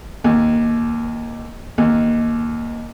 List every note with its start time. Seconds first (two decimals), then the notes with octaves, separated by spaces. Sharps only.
0.24 D#2
1.78 D#2